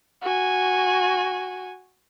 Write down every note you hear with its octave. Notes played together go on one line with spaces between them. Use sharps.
F#4 G#5